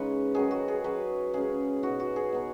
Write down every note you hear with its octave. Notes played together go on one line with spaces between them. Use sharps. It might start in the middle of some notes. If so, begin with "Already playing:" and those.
Already playing: C#3 G#3 C#4 D#4 B4 C#5
D#3 F#3 C#4 G#4
F#4
G#4
F#3 C#4 B4
C#3 G#3 C#4 G#4
B2 B3 D#4 F#4
F#4
G#4
B2 B3 D#4